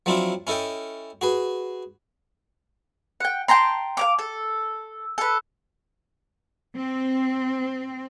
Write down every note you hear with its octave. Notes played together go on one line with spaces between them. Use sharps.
F3 F#3 C4 D4 E4 F4
C#4 E4 A4 D#5 G5
F#4 G#4 B4
F#5 G5
G5 A5 A#5 C6
F5 A#5 D6
A4
A4 B4
C4